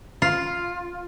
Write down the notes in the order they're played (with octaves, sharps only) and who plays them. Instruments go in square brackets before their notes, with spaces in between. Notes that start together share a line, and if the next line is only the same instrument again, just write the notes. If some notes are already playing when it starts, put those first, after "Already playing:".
[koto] F4